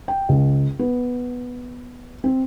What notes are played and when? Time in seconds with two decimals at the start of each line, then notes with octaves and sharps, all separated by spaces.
0.08 G5
0.29 C#2
0.79 B3
2.24 C4